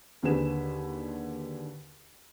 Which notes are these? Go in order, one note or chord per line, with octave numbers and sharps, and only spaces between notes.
D#2 D3 G#4 B4 E7